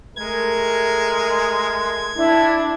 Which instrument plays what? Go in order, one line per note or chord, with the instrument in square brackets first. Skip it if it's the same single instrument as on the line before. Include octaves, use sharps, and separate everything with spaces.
[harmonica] G#3 [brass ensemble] A3 A#4 [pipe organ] G#6
[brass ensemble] D4 [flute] E4